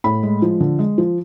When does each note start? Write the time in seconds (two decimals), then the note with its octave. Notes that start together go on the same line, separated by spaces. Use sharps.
0.04 A2 B5
0.23 G#3
0.42 F3
0.60 D3
0.79 G#3
0.98 F3